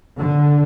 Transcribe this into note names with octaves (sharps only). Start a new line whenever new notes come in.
D3